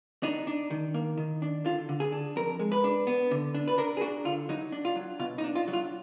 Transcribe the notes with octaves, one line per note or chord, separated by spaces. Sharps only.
D4 D#4
D4
D#3
A#3
D#3
D4
D3 F4
D3
G#4
D4
F2 A#4
G#3
B4
D4
B3
D3
D4
B4
D4 A#4
G#4
D4 F#4
D3 F4
F#3 D#4
D4
F4
F#3
B2 F4
D#4
D4
F4
F#3
F4